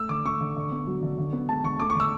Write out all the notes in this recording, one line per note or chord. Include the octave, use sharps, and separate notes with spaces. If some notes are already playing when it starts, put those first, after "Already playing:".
Already playing: A3 E6
D3 D6
A3 C#6
D3
D3
B3
F#3
D3
D3
B3
G#3 A5
D3 C#6
A3 D6
C#6
D3 E6